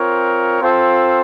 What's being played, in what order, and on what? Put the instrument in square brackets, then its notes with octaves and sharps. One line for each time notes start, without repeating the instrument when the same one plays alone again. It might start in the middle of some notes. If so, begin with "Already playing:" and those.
Already playing: [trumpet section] C4 F4 A#4 C#5
C4 F4 A4 C5